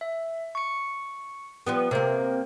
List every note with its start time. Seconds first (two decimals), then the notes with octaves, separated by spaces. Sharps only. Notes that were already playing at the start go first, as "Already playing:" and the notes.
0.01 E5
0.55 C#6 C#7
1.67 F3 G3 B3
1.91 C3 A#3 A#4 C5